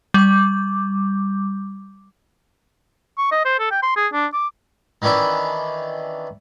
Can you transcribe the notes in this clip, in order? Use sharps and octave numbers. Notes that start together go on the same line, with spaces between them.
G3 D6
C#6
D#5
C5
A4
G5
C6
G#4
D4
D6
D#3 E3 C#4 D4 E4